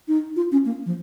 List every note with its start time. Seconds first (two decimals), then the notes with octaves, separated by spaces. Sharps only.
0.08 D#4
0.36 F4
0.52 C#4
0.66 A#3
0.86 F3